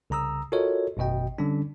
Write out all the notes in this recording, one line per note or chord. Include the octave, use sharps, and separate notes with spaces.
C2 C#3 A#5 D#6 E6
F4 F#4 A4 A#4 C#5 D#5
G#1 F#2 B2 D#5 G5
D3 G3 C#4 D4